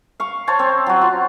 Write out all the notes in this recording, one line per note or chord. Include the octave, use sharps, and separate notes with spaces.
F5 C#6
C5 C#5 F5 A5
C4
F#3 F#4
F4